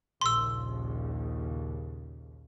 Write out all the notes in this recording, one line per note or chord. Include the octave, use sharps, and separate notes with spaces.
A#1 D#2 C#3 C6 E6